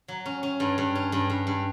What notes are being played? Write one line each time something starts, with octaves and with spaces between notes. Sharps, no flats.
F#3
C#4
C#4
G2
G2
C#4
G2
G2
G2